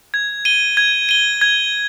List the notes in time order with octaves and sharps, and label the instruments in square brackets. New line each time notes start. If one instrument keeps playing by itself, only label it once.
[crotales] G#6
D#7 G7
G#6
D#7 G7
G#6